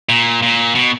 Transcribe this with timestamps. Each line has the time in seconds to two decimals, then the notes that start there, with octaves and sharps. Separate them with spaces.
0.09 A#2
0.43 A#2
0.75 B2